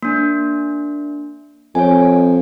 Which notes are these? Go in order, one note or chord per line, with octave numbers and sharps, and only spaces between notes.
A#3 D4
F2 C#5 G#5